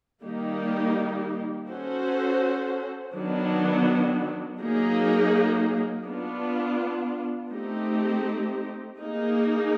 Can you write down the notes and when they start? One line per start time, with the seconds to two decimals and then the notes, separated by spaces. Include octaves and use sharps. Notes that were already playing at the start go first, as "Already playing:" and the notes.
0.22 D#3 G3 A#3 D#4 G4
1.68 C#4 F#4 A4 C5
3.13 D#3 F#3 B3 D4
4.59 F#3 A#3 D#4 G#4
6.05 B3 D4 F4
7.51 A3 C4 D#4 G4
8.97 A#3 D#4 G#4